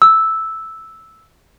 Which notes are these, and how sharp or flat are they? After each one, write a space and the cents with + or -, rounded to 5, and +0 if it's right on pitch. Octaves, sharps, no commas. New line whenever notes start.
E6 -5